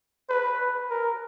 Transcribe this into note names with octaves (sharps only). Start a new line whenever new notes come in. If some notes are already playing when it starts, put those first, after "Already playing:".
B4
A#4